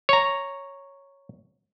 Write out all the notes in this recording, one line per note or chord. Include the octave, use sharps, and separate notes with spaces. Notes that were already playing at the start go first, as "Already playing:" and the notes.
C#5 A#5